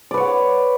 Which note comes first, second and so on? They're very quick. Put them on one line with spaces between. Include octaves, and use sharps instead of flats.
D5 B4 C#5 F#5